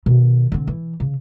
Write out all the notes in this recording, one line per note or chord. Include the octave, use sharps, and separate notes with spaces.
B2 D#3
D3 C4
E3
C#3